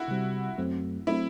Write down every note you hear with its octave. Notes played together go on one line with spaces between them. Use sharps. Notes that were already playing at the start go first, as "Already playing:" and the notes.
Already playing: E4 F#4
C3 G3 C4
F#2 F#3 A3 C4
F#3 A3 C4 E4